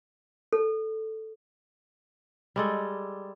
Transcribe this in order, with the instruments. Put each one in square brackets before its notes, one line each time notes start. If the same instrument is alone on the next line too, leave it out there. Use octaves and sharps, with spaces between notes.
[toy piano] A4
[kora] G3 G#3 A4